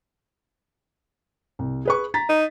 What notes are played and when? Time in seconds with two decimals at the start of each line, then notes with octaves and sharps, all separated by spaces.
1.59 C2
1.85 G#4 B4 C#6
2.14 A#5 A6 B6
2.29 D#4